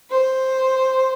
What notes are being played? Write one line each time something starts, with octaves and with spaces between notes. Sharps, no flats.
C5